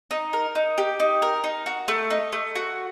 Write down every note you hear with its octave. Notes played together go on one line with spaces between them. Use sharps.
D#4
A#4
D#4
G4
D#4
A#4
D#4
F#4
A3
D#4
A3
F#4